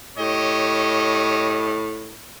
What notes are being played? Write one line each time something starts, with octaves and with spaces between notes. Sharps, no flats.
A2 G4 C#5 D#5